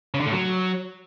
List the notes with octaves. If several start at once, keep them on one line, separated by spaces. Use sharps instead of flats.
C#3
D3
A2
F#3